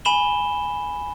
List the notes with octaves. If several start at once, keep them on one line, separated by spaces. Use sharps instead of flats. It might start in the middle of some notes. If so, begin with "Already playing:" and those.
G#5 B5 E7 G7